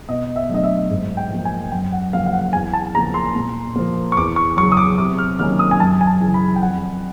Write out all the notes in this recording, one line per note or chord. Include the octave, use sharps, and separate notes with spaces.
B2 D#5
E5
F#3 A3 D4 D#5
E5
G#2
G5
F3 A#3
G#5
F#2 G5
F#5
C#3 F3 A#3 F5
F5
F#5
E2 G#5
A5
C#3 F3 A#3 A#5
C6
A#2
F3 A#3
C#6
E2 D6
C#6
C#3 F#3 C#6
D#6
D6
C3 D6
F6
D#3 F#3 A#3 C#4 F6
D#6
G#5
F#2 A5
G#5
A5
C#3 E3
B5
G5
F2 F#5